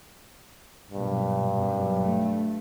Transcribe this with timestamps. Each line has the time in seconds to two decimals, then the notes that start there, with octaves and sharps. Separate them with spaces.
0.91 B1 G2 A#2
1.54 B1 F#2
2.01 A3